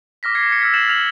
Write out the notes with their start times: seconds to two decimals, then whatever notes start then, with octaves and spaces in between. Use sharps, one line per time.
0.23 D6 F6 A#6 B6
0.35 D6 G#6 C7 C#7
0.48 G#6 C#7
0.60 E6 F6 G#6 B6
0.74 D6 G6 A6 C7 E7 F#7
0.88 F6 F7 F#7